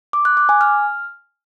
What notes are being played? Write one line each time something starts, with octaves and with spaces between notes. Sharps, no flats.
D6
F#6
D6
G#5
F6